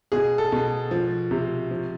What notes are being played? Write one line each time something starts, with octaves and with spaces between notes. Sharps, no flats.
B2 G#4
A4
B2
F3
C3
F3